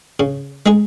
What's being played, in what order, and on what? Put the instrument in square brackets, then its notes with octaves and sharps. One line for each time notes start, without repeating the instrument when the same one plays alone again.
[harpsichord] C#3
G#3 D#4 G#4